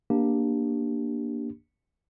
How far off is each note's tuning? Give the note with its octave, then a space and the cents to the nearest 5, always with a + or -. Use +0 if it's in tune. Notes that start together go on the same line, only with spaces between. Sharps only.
A#3 +10 D4 +0 G4 +0